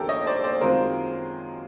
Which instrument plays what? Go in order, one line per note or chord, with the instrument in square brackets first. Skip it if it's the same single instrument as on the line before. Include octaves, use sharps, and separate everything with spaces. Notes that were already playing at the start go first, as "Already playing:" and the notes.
Already playing: [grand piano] D#2 C#3 F3 D4 [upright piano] G4 A4 A#4
[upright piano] C#5 D#5
C5 D5
C5 D5
[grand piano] F#2 D#3 G#3 C4 F4 [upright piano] A#4 C5